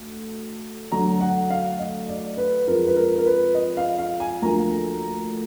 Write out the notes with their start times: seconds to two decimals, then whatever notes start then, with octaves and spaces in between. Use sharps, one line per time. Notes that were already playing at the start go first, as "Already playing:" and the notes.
Already playing: D2
0.92 D2 D3 F#3 A#5
1.21 F#5
1.50 F5
1.79 D#5
2.09 D5
2.37 B4
2.67 F2 F3 G#3 A#4
2.87 B4
2.96 A#4
3.18 A#4
3.26 B4
3.54 D#5
3.77 F5
3.98 F5
4.20 G#5
4.42 D2 D3 F3 A#3 D4 A#5